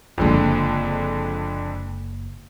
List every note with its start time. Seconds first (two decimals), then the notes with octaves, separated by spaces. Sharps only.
0.18 F#1 F2 D3 G#3 A#3